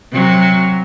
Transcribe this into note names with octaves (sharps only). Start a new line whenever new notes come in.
C3 F#3